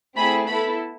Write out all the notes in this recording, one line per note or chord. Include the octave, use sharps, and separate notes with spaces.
A3 C4 E4 G#4 B5
B3 E4 A4 B5